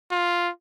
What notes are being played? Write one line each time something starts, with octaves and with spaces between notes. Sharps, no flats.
F4